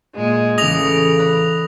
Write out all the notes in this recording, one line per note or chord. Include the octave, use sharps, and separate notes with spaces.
A#2 G#3
A1 C#3 E5 D6 D#6 A#6 F7
B4 D5 A#5